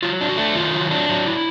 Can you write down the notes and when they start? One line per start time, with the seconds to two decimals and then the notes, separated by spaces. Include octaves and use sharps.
0.03 F#3 F4
0.21 D4
0.29 F#4
0.38 A3
0.55 D#3 F4
0.73 F#3
0.91 D4
1.09 F#3
1.27 E4